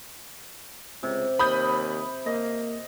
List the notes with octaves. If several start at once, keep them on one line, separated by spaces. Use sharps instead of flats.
C#2 C3
D#2 B5 D#6 G6
A#3 D#5